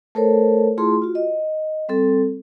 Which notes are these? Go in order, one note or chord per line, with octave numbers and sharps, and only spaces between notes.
A3 A4 A#4 C5 C#5
A3 E4 F4 G#4 C6
F4 F#4
D#5
G3 C4 A4